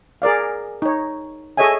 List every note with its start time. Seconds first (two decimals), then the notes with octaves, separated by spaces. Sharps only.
0.22 G#4 A#4 D5 F5
0.82 D#4 C#5
1.57 G#4 A4 C#5 D#5 E5 G#5